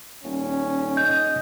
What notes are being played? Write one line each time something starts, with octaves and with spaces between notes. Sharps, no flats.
D#1 C#4
D#5 G6